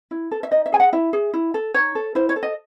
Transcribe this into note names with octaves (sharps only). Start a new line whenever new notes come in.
E4
A4
E5
D#4 D#5
E5
G#4 G#5
F#5
E4 E5
G#4
E4
A4
D#4 C#5
A4
E4 C5
C#5
A4
D#5